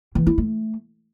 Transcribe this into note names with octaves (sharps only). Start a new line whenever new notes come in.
E3
E4
A3